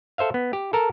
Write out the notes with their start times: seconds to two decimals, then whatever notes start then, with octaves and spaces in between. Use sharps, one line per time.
0.18 A4 C5 E5 F5
0.34 B3
0.53 G4
0.73 A4 A#4 A5